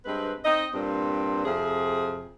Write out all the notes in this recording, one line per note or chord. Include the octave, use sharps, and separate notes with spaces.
G2 G#3 C4 B4
C4 D#4 D#5
G2 A#2 C4
F2 C3 G#4